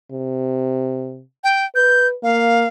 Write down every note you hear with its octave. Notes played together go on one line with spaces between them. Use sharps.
C3
G5
B4 G6
A#3 F5